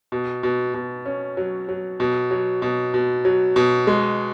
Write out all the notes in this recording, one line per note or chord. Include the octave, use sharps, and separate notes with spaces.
B2
B2
B2
C#4
F#3
F#3
B2
F#3
B2
B2
F#3
B2
G#3